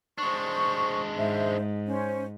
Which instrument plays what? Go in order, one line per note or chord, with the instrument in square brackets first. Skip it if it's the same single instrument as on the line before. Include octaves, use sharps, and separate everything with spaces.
[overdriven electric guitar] G#3 D4 [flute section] C5 C#6
[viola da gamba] G#2 [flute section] C5 E5
[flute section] C#4 C5